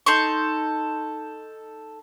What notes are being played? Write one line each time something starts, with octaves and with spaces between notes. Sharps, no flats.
D#4 A4 C6 C#6